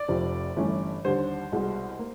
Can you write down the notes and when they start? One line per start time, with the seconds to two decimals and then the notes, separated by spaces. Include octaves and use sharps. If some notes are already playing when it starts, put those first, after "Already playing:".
Already playing: D5
0.08 F1 F2 C3 F3
0.57 G1 G2 E3 A3 C#4
1.05 D#2 D3 G3 C5
1.52 C2 B2 G#3
1.99 A#3